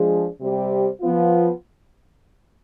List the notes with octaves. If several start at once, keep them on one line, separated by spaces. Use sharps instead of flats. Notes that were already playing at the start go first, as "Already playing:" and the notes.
Already playing: F3 G#3 D4 G#4
C3 G3 C4 G4
F3 B3 F4